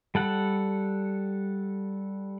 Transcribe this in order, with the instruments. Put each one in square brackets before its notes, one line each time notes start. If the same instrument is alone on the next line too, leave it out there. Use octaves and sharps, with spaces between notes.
[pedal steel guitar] G3 A4 F#5